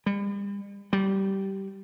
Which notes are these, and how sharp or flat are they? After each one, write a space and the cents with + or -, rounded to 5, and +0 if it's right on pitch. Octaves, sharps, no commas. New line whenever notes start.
G3 +40
G3 -15